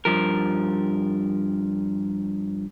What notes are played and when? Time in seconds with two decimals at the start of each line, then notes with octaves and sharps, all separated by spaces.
0.05 G2 F3 A#4